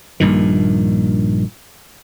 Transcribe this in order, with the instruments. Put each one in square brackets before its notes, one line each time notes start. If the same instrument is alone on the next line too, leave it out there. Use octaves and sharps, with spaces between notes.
[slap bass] A#1 G2 A#2 D#3